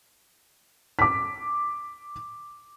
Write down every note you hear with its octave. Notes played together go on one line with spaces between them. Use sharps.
D6 B6